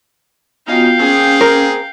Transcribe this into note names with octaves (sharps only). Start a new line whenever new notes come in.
B3 C#4 D#4 F4 F#4 F5 G5
A#3 C4 C#4 G#4
A#4